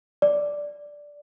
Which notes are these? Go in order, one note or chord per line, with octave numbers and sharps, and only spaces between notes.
D5